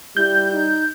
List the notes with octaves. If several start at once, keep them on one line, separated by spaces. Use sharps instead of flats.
G3 E4 G6
D#4